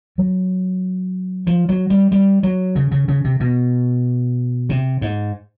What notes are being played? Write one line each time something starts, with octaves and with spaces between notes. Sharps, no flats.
F#3
F3
F#3
G3
G3
F#3
C#3
C#3
C#3
C3
B2
C3
G#2